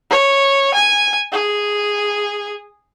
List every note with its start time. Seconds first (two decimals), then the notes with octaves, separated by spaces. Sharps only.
0.10 C#5
0.74 G#5
1.32 G#4